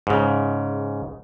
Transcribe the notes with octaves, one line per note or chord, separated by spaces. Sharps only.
G#2 C#3